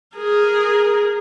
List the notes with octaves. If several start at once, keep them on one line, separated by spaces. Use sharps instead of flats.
G#4 A#4